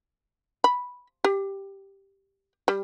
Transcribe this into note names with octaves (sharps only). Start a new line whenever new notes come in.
B5
G4
G3